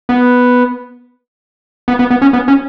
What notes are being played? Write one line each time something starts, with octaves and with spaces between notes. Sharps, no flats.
B3
B3
B3
B3
C#4
B3
C#4